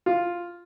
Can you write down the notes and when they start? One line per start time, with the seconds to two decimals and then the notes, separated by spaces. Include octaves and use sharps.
0.06 F4